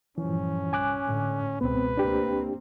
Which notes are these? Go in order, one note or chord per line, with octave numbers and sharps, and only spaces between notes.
G2 A#2 E3 F3 C#4
C2 G#5 D6 F#6
G#1 A2 D3
C#2 B2 B3 C4 B4
D2 A#3 C4 D4 G4